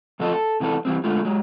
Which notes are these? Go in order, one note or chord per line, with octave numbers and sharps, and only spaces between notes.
A#2 F3 A3 F4 A4 D#5
A4
C3 E3 B3 F4 A4
E3 G3 C4
D3 G#3 A3 F4
F#3 G#3